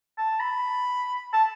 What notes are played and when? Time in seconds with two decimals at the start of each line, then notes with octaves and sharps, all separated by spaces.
0.18 A5
0.40 B5
1.33 A5